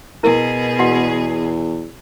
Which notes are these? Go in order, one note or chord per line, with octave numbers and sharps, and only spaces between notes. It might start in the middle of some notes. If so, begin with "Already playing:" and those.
B2 E4 G#4 A#4
E2 F#4 F#5